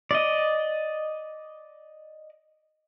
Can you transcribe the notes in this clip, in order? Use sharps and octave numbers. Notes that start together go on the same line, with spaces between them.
D5 D#5